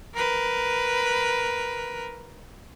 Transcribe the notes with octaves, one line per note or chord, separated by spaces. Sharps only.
A#4 B4